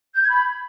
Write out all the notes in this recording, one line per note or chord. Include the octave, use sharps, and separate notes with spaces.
G6
G#6
B5